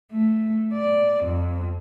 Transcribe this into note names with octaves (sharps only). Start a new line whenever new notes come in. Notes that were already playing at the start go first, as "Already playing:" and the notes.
A3
D5
F2